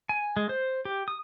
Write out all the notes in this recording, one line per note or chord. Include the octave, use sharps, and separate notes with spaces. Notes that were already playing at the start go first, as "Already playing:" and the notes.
G#5
G#3
C5
G4
D#6